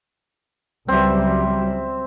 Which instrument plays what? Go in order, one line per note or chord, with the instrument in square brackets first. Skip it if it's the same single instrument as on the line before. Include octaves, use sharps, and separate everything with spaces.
[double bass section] C#2 F#3 G3 [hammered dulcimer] C4 E5